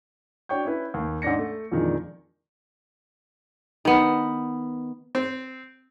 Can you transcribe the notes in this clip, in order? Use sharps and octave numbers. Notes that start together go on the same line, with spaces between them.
D4 F#4 C#5 G5 C#6 G6
C#4 E4 B4
D#2
G#2 C#4 D4 A#6 C#7
A3
F2 A#2 D#3 E3 G#3 D4
D#3 B3
C4